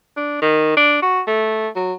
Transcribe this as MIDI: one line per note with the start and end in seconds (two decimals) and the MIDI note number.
0.17 0.40 62
0.42 0.72 51
0.77 1.02 62
1.02 1.21 66
1.27 1.68 57
1.76 1.93 54